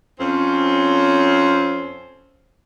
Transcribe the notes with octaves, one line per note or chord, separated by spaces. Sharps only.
F2 C4 C#4